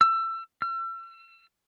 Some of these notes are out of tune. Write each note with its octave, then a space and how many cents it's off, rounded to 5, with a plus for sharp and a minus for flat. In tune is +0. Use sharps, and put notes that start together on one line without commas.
E6 +25
E6 +40